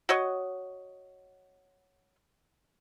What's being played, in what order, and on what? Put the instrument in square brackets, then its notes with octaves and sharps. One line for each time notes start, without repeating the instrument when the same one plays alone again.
[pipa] F#4 C#5 D#5